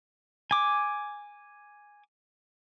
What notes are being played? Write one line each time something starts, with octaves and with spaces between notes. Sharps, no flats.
G#5 D6